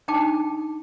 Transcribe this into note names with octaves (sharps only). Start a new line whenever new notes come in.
D4 D#4 G5 A5 D6